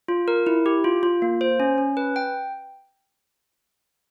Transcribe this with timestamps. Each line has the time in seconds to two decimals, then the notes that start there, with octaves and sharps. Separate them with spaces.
0.08 F4
0.28 A#4
0.47 E4
0.66 G4
0.84 F4
1.03 F4
1.22 A#3
1.41 C5
1.60 C#4
1.78 C#4
1.97 B4
2.16 G5